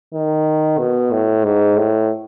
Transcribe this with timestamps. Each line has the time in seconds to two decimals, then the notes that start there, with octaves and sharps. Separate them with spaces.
0.13 D#3
0.78 B2
1.12 A2
1.44 G#2
1.76 A2